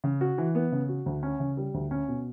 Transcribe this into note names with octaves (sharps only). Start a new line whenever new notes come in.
C#3
F#4
E3
B3
C#3
F#4
D2
C#4
C#3
G3
D2
C#4
B2